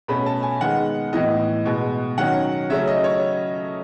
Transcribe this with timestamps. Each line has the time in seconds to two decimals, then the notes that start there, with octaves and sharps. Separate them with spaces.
0.08 B2 A3 C#4 B5
0.26 A5
0.43 G#5
0.61 D#3 G#3 B3 F#5
1.13 A2 E3 B3 D#5
1.66 B2 G#3 B3
2.18 D#3 F#3 C#4 F#5
2.70 C#3 F#3 A3 C#4 E5
2.87 D#5
3.04 C#5